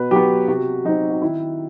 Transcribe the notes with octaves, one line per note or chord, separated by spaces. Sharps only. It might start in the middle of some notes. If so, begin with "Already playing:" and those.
Already playing: B2 B4
F#3 B3 G4
C3 F#4
F#3 C4 D#4
F#4
D#3 E4